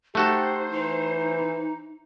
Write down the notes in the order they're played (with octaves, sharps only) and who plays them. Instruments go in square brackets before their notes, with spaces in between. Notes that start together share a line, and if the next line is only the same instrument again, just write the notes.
[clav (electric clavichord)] A3 F#4 A4 [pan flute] D#4 [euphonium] G4 [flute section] C5
[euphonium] E3 [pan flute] D#4